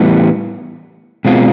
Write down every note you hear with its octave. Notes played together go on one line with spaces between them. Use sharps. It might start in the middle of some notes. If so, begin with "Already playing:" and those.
Already playing: A2 E3 G3 B3
B2 G#3 C4 F4